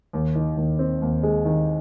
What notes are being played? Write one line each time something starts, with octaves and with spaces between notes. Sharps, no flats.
D#2
D#3
D#2
C4
D#2
G#3
D#3